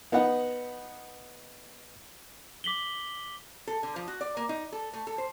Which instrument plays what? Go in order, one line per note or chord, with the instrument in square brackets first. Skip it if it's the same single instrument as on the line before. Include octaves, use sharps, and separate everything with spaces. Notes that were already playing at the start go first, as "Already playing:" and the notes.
[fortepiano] B3 D#4 B4 F#5
[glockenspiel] D6 B6 F#7 G7
[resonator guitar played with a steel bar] A4
D3
F3
F#4
D5
A#3
D#4
A4
A3
A4
C5